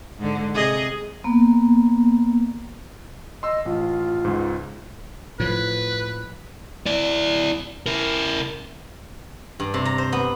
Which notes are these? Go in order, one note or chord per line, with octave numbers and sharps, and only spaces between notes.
G#2 D3
C3 G#4 D#5
A#3 B3
D#5 C6 E6
A1 F4
C#2 G#2
A2 F3 B4
E4 D5
E4 A#4
G2
C3
A#5
C5
B3